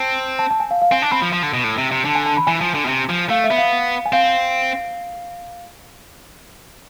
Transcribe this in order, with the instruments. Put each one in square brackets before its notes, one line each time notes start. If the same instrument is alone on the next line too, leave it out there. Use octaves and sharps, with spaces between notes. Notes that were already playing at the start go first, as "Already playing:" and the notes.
Already playing: [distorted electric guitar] C4 [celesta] A5
[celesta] A5
A5
G#5
F5
F5
[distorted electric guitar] C4 [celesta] G#5
[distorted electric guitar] D4 [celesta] A5
[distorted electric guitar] C4 [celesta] B5
[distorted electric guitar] F3
F3
D3
B2
A2
C3
C3
[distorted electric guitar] D3 [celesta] A5
[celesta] G#5
A5
B5
[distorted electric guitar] E3 [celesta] G#5
[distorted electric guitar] F3
D3
B2
C3
F3
[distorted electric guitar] A3 [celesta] F5
[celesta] E5
[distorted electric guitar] B3
[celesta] F5
G#5
[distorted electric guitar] C4 [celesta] F5